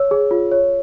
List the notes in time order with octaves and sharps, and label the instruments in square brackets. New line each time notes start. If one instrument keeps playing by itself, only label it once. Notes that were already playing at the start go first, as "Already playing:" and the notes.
Already playing: [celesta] C#5 E6
G#4
F4
C#5